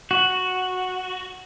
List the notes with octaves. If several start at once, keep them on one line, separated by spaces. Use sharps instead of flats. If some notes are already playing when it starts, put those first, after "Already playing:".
F#4